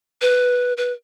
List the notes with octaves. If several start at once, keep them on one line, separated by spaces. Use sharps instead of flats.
B4
B4